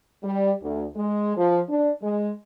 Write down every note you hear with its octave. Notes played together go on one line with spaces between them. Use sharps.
G3
D2
G#3
F3
D4
G#3